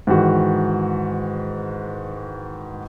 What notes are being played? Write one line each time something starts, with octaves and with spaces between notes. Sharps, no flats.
G#2 D#3 E3 F#4